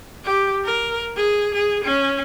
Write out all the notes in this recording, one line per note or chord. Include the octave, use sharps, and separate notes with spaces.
G4
A#4
G#4
G#4
C#4